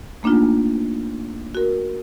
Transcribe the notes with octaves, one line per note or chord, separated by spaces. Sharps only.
A3 A#3 D4 D#4 F4
F#4 A#4